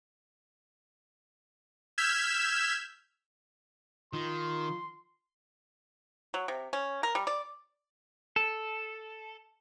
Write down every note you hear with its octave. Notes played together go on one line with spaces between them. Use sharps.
E6 F6 G6 G#6 B6 E7
D#3 F4 C6
F#3
C3
C#4
A#4
G3
D5
A4